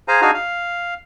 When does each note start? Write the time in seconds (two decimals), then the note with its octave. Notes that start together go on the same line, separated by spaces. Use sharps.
0.08 G#4 C5 F5 G#5 A#5
0.22 D4 D#4 F#4 G#4 F5 G#5
0.34 F5